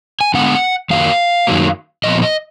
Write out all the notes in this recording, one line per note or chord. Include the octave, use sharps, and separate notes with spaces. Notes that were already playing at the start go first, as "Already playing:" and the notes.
G#5
D3 G#3 B3 F#5
F#2 D#3 F#3 A#3 F5
F#2 D#3 F#3 A#3
A#2 F3 B3 D#5
D#5